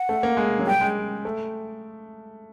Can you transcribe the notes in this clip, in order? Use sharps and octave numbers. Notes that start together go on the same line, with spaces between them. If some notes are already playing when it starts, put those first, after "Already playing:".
Already playing: F#5
A3
A#3
G#3
F#3
G3 G5
G#3
A3